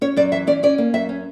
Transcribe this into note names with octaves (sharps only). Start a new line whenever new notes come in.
C#4 C#5
F#2 D5
E3 E5
C#4 D5
C#4 D5
A#3
F#2 E5
C#4